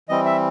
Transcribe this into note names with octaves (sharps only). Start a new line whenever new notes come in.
E3 G3 C4 D#5
E5